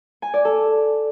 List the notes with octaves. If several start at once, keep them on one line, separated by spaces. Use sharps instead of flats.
G#5
D5
A4